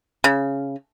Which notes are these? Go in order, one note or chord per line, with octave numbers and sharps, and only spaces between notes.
C#3